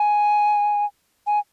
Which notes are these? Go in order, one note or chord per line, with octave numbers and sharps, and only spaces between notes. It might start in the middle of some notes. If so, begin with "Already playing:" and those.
Already playing: G#5
G#5